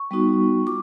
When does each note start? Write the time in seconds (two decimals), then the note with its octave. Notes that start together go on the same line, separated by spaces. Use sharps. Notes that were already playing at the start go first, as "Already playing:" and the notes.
Already playing: C#6
0.11 G3 B3 D#4 F#4
0.67 F4 D6